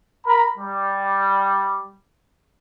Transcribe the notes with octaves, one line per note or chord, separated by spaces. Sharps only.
A#4 A#5 B5
G3